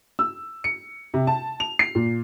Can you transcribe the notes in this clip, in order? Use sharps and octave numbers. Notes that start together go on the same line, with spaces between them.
E6
C#7
C3
A5
F7
C7
A#2